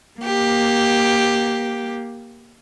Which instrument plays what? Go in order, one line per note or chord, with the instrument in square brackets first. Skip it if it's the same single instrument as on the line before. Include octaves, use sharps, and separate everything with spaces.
[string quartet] A#3 G4